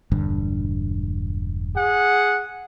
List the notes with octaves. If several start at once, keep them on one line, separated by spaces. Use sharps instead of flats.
E1 G2 D3
G#4 F#5